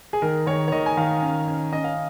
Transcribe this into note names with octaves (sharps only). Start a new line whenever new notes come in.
G#4
D#3 A#4
D#3 C#5
C#5
D#3 D#5
G#5
D#3 F5
C#4
C#4
C#4 D#5
F5